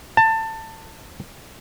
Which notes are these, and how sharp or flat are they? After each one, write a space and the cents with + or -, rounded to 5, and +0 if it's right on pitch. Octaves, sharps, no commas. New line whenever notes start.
A5 +20